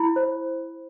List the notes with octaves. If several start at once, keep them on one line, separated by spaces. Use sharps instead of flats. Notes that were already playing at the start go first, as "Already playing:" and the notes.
Already playing: E4 B5
C5